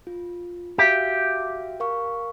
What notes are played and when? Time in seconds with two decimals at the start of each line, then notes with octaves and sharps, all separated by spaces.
0.07 F4
0.78 F#4 G4 E5 F5
1.80 A#4 F5 C#6